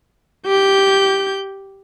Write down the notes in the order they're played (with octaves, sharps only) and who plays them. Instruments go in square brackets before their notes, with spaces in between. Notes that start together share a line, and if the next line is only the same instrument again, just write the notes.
[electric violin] G4 G6